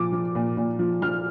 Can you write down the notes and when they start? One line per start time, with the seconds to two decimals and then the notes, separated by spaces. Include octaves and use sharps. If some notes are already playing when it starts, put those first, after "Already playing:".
Already playing: A#2 F3 D6
0.12 F3
0.35 A#2
0.57 A#2
0.79 F3
1.02 F3 F6